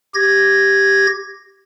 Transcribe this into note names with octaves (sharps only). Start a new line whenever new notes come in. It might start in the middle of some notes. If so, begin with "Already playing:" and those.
G4 G#6 A#6